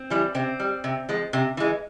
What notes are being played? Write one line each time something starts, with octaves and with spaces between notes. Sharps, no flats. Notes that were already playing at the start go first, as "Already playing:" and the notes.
Already playing: C4
E3 G3
C3 C4
G3
C3
F3 G#3
C3
E3 G#3